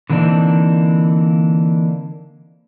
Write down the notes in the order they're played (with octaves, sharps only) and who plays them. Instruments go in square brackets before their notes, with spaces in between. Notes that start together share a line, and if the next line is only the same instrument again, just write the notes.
[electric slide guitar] D3 E3 A#3 C4 D4 D#4